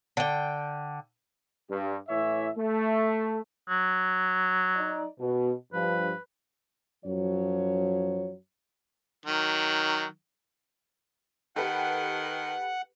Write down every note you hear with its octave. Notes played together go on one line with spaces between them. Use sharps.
D3 G5
G2
A2 E3 C#5 E5
A3
F#3
D#4 D5
B2
G2 F3 B4
F#2 F3 F#3 C#5
D#3 F#3
D#3 G4 A4 B4 F#5